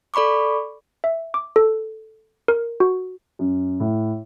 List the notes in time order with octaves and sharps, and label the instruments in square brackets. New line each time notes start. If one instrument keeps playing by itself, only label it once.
[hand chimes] A4 D5 B5 C#6 D6
[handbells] E5
D6
A4
A#4
F#4
[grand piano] F#2
A2